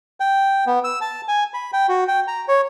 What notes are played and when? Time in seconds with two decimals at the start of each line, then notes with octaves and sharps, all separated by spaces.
0.20 G5
0.67 B3
0.84 E6
1.01 A5
1.28 G#5
1.54 B5
1.73 G5
1.89 F#4
2.08 G5
2.28 A#5
2.48 C#5